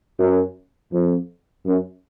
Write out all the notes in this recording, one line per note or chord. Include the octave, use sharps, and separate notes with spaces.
F#2
F2
F#2